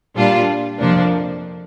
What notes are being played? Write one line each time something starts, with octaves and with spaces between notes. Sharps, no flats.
A#2 G3 D4 F4
F2 C3 F3 A#3 D4